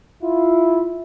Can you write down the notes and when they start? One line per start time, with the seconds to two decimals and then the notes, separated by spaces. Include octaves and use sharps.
0.22 E4 F4